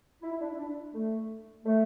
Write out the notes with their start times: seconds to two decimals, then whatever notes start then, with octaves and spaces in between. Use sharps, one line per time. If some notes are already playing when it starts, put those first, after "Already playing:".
0.22 E4
0.32 E4
0.40 D4
0.51 E4
0.57 D4
0.93 A3
1.64 A3